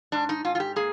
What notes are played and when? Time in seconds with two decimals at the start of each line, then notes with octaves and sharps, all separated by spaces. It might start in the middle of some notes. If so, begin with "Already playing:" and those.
0.12 G#2 D4
0.29 D#4
0.44 G#2 F4
0.55 F4
0.60 G4
0.76 A#3 G#4